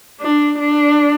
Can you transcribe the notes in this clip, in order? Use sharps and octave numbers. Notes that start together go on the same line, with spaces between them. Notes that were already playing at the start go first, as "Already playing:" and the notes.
D4
D4